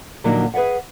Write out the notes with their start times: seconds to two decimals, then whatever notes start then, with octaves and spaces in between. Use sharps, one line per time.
0.24 A#2 D3 F3 F#3 A#3 D#4
0.54 G#4 B4 D5 E5 F#5